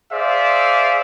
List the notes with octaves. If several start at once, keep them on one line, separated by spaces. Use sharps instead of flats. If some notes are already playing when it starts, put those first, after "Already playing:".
G#4 C5 D5 E5 F5